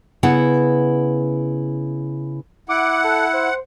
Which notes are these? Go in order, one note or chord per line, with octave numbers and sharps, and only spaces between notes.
C#3 B3 E4 F#5
E4 F#5 D6
A4
C5